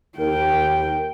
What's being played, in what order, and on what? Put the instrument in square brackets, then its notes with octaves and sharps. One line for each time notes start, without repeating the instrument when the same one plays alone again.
[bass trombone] D#2 [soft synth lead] A#4 [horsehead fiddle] G5